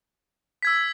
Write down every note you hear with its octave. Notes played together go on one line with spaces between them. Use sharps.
E6 G#6 B6